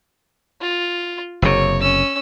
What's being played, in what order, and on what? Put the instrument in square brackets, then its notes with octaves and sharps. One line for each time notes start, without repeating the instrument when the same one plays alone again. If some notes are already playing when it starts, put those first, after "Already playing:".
[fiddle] F4
[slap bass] F#1 C3 [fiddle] C#5
[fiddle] C#4 E6